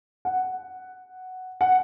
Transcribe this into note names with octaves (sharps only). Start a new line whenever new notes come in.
F#5
F#5